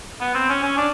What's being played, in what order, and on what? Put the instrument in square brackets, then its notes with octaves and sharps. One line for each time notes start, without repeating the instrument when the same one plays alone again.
[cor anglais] B3
C4
C#4
C#4
D4